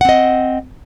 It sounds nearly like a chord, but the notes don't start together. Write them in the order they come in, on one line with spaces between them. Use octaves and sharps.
F#5 C4 D#5